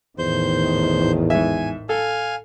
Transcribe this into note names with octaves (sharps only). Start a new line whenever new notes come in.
A1 E2 A2 D#3 C5 G6
G#2 E5 G#5
A4 F5 G#5